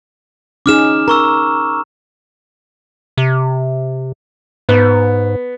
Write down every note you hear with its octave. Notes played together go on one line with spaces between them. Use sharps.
C#4 D#4 G#4 D6 F6 E7
A#4 A#5 C#6 E6
C3
G#2 B3